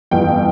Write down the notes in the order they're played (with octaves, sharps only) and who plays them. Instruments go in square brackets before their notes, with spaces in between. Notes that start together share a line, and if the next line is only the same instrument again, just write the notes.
[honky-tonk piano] G1 F2 E3 G5